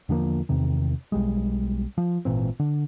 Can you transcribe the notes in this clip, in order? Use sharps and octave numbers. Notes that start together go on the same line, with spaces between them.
E2 D3 F3 A#3
E2 C3 D#3
B1 G3 G#3
F3
G#1 A#2 E3 C4
D3